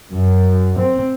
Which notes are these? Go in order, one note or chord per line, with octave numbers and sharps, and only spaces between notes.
F#2
C4